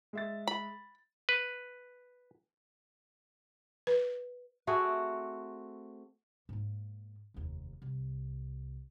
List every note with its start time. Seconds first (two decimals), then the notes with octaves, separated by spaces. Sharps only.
0.13 G#3 E5 A6
0.48 B5
1.29 B4
3.87 B4
4.67 A3 C4 F#4 G#4
6.49 G#2 A#3
7.34 F1 D#2
7.82 C2